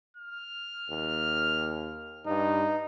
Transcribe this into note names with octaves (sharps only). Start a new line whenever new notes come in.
F6
D#2
G2 D#4